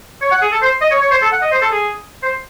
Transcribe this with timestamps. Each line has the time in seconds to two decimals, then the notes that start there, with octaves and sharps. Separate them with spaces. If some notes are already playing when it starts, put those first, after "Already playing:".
0.22 C#5
0.31 F#5
0.42 G#4
0.52 A4
0.62 C5
0.81 D#5
0.91 C#5
1.02 C#5
1.12 C5
1.22 A4
1.32 F#5
1.42 D#5
1.52 C5
1.62 A4
1.72 G#4
2.23 C5